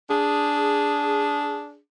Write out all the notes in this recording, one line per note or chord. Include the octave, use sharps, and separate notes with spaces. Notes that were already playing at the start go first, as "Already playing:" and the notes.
D4 G#4